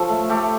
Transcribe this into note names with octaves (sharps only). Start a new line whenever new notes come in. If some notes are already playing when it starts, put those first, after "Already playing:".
Already playing: F3 A4 C#5
A3
A3 G4